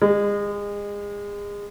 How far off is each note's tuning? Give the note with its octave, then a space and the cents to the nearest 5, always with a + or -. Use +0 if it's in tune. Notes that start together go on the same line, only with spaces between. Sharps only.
G#3 -30